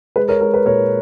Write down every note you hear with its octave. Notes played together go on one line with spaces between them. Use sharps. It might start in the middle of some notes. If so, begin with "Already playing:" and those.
G#3 B4
A#4 C#5
G#3 A#4
B4
A#2 A#4 C#5